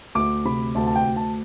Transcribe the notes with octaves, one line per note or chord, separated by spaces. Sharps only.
D2 D6
C3 B5
D2 A5
A5
G5
D2
A5